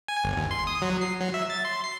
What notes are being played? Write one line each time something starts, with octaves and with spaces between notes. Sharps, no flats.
G#5
G1
D#2
C6
D#6
F#3
C7
F#3
E5
A6
C6
C7